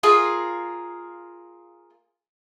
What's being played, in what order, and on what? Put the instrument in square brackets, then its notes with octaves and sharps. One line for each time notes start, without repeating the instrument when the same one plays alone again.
[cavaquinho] F4 G#4 A#4 F5